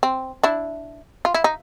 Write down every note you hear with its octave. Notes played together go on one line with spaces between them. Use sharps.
C4
D4 E4
F4
E4
D#4